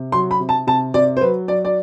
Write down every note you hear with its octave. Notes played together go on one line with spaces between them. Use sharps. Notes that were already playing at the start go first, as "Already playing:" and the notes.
Already playing: C3
F#3 C6
B5
C3
A5
C3 A5
C3 D5
C5
F#3 B4
F#3 D5
D5